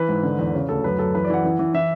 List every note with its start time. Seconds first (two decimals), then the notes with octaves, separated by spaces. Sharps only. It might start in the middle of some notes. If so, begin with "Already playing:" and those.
Already playing: E3 B4
0.08 G#2
0.23 D3
0.39 E2
0.54 C#3
0.69 D2 A4
0.84 F#2 B4
0.98 F#2 A4
1.15 E3 B4
1.24 D5
1.30 E3 F#5
1.44 E3
1.59 E3
1.74 E3 E5